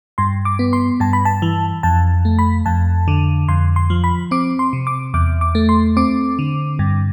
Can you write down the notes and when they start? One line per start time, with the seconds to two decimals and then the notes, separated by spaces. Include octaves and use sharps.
0.18 G2 C6
0.45 D6
0.59 B3
0.73 C6
1.00 G2 A5
1.13 B5
1.25 A5
1.42 E3
1.83 F2 A5
2.25 A3
2.39 B5
2.66 F2 A5
3.08 D3
3.48 F2 C6
3.76 C6
3.90 F3
4.04 B5
4.31 C4 D6
4.59 C6
4.73 C3
4.87 D6
5.14 E2 D6
5.41 D6
5.55 A3
5.69 C6
5.97 C4 D6
6.39 D3
6.79 G2